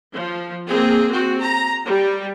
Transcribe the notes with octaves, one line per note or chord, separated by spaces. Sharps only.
F3
A#3 C4 G#4
C4 F#4
A#5
G3